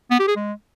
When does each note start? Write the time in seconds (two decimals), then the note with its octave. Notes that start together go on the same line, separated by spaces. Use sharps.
0.11 B3
0.19 G4
0.28 G#4
0.36 G#3